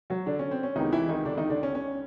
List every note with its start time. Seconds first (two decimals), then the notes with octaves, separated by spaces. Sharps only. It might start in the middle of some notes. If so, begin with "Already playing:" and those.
0.10 F#3 F#4
0.26 D3 D4
0.39 C#4
0.51 C4
0.63 C#4
0.76 C#2 C3 D#3 E3 G#3 B3 D#4
0.92 E3 E4
1.09 D#3 D#4
1.25 D3 D4
1.37 D#3 D#4
1.50 D3 D4
1.63 C#4
1.75 C#4